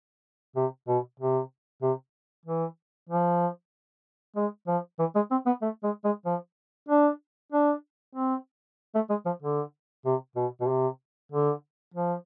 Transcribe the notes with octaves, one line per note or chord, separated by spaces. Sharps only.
C3
B2
C3
C3
E3
F3
G#3
F3
E3
G#3
C4
B3
A3
G#3
G#3
F3
D4
D4
C4
A3
G#3
F3
D3
C3
B2
B2
C3
D3
F3